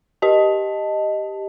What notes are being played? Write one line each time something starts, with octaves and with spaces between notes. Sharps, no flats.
G4 D#5 A5